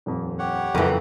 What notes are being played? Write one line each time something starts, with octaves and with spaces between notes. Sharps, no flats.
D#1 F2
G4 C#5 F#5
F#1 F2 E3 G5